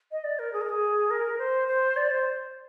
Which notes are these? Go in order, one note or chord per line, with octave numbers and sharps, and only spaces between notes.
D#5
D5
A#4
G#4
A#4
G#4
A#4
C5
C5
D5
C5